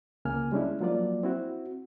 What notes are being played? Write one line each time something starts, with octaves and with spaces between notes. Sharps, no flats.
C#2 C#3 A#3 G#5 F6
G3 G#3 C#4 D4 E4
F3 F#3 A#3 F4 D5
C4 E4 F#4